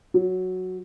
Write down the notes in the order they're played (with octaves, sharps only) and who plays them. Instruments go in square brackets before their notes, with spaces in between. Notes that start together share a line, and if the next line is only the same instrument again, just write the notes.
[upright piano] F#3